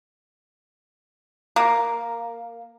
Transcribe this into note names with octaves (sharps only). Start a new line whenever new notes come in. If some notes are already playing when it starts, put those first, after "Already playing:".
A#3